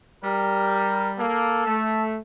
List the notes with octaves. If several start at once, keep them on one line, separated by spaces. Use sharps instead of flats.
G3 A#4
A#3 A4
A3